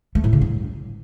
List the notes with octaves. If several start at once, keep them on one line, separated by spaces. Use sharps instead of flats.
A3
A2
C#3
G2